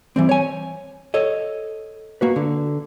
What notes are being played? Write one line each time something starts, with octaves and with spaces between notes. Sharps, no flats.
E3 G3 C4
C#5 G#5
A4 C#5 D#5
A#3 F#4 B4
D3